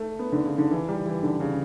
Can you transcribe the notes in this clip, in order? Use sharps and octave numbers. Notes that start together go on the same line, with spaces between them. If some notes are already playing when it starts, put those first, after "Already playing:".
Already playing: A3
B3
D3
C#3
D3
E3
G3
E3
D3
C#3